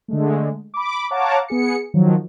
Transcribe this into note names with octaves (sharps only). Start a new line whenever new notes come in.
D3 G#3 A3
B5 D6
C#5 F5 F#5 A5 A#5 D6
B3 G#4 C#7
D#3 F3 F#3